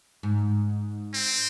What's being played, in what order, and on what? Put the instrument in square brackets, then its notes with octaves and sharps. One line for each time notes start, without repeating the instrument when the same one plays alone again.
[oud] G#2
[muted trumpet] C4